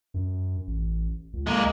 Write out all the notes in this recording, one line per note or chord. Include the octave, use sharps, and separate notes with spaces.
F#2
A1
C#2
G#3 A#3